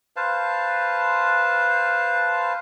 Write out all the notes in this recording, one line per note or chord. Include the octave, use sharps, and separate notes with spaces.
B4 C5 F5 A5